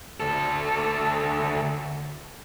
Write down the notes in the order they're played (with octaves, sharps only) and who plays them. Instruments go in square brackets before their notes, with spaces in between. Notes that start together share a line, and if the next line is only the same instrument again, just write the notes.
[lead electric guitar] D2 A4